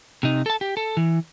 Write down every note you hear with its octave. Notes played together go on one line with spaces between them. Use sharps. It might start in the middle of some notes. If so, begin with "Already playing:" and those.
C3 D#4
A4 A5
G4
A4
E3